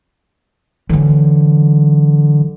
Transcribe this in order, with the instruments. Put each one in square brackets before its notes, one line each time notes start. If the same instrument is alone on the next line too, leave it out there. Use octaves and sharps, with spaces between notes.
[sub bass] D3 [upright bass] E3 F#3